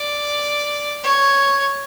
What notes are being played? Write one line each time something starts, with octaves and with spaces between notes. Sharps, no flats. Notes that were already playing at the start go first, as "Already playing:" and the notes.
Already playing: D5
C#5